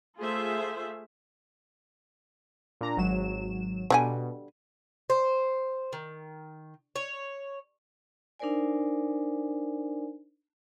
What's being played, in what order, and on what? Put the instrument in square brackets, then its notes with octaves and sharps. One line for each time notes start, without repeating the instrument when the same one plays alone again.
[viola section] A3 F4 G#4 C5 E5
[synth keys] A#2 D4 A#5
G#1 F#3 E7
[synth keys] B2 [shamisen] D3 G3 G#5
[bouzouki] C5
D#3
C#5
[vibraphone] D4 D#4 A#4 C5 D5 G#5